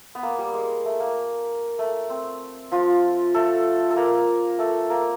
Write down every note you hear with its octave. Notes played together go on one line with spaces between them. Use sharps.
B3
A#3
G3
G#3
A3
A#3
A3
C4
F3 F4
A3 A4
A4
A#3 A#4
A3 A4
A#3 A#4